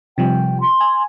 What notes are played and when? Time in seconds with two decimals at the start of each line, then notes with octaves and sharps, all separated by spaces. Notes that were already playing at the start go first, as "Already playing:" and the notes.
0.18 C3 F3 G3 G5
0.61 C6
0.81 G#5